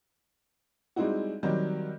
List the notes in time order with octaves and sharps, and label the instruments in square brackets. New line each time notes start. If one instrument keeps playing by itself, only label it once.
[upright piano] G3 G#3 C4 D#4 E4 F#4
D#3 F#3 G3 C4